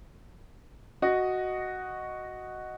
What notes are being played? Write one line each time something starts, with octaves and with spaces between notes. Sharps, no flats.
F#4 D#5